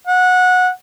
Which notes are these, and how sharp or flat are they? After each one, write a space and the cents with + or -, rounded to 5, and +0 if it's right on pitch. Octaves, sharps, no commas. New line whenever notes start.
F#5 -20